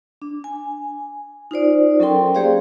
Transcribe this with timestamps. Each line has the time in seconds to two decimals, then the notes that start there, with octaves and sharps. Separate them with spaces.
0.22 D4
0.44 G#5
1.51 D#4 F4 C5 D5
2.00 F#3 C#4 A4 A#4 G5 C6
2.35 A#3 G4 G#4 C5 D5 F5